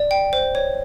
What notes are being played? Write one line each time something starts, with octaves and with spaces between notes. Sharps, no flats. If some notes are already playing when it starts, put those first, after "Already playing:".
Already playing: D5
G5
C5
C#5